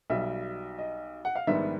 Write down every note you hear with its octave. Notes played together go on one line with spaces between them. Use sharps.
B1 B2 G3 E5
D#5
F#5
F5
A#1 G#2 D#3 G3 B3 E5